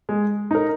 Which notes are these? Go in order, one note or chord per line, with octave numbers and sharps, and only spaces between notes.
G#3
D#4 A#4